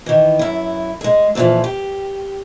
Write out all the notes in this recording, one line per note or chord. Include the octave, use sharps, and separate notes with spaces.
D#3 E3
F#2 E4
G#3 G#4
F2 A#2 C#3 E3 F3
G4